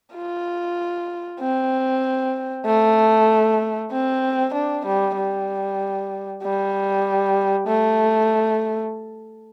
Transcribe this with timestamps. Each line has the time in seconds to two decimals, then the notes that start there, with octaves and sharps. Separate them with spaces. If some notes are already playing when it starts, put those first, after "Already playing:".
0.15 F4
1.41 C4
2.66 A3
3.92 C4
4.54 D4
4.86 G3
5.16 G3
6.43 G3
7.67 A3